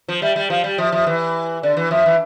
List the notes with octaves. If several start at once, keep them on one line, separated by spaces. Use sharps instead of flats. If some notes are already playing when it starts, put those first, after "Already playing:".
F3
G3 E5
G3
F3 F5
G3
F3 E5
F3
E3
D3 D5
E3
F3 E5
E3